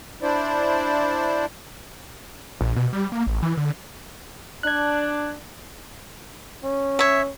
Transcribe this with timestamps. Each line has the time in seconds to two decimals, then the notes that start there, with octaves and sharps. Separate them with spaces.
0.22 D4 E4 C5 D5
2.61 A#1
2.76 B2
2.93 G3
3.12 A#3
3.27 A1
3.43 E3
3.57 D3
4.63 D4 F#6 G#6
6.64 C#4
6.99 C#5 E5